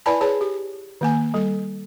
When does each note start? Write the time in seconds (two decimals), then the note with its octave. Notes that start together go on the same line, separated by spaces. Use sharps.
0.06 E4 B4 D5 G#5 A5 B5
0.21 G#4 B4 C#5 A5
0.41 G4
1.01 D#3 A#3 G#5
1.34 G3 A4